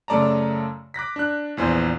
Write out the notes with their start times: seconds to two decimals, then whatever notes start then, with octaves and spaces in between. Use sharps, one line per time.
0.08 F#2 C#3 A3 D5 A5 A#5
0.94 D6 F#6 A#6 B6
1.16 D4 F#6
1.57 A#1 E2 C5 G#5